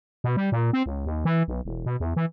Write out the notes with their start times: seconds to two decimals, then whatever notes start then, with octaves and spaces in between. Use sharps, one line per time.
0.24 B2
0.37 G3
0.52 A#2
0.73 C4
0.86 C#2
1.06 D#2
1.25 E3
1.48 B1
1.65 E1
1.86 B2
2.00 E2
2.16 E3